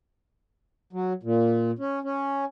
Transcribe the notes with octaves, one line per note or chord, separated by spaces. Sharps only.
F#3
A#2
C#4
C#4